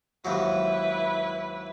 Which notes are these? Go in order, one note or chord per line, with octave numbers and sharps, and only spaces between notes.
D#2 G#2 F#3 E4 B4